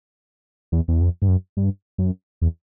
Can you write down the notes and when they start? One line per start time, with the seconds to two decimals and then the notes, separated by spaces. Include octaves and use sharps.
0.72 E2
0.88 E2
1.01 F2
1.22 G2
1.28 F#2
1.57 G2
1.98 F#2
2.42 E2